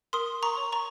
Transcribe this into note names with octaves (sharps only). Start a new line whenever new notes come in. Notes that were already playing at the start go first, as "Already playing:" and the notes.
A#4 C6 D#6
A#5 C#6
C#5
A#5 C#6